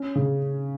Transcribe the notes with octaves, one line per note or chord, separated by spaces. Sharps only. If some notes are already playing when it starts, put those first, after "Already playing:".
Already playing: C#4
C#3